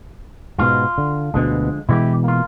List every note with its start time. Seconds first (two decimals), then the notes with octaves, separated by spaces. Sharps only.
0.59 G#2 B2 F4
0.98 D3
1.34 D2 B2 D3 F3 G#3
1.89 B2 E3 G#3 E4 F#4 G4
2.24 A#3 F4